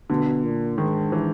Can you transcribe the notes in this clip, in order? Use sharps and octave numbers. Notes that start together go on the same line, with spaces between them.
B2 D3
A#2
G#2 D#3
E3